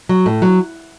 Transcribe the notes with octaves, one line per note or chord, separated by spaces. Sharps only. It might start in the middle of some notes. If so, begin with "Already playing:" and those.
F#3
A2
F#3